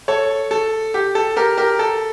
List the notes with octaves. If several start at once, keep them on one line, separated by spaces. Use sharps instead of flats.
A4 C#5
A4
G4
A4
G4 A#4
G4 A#4
A4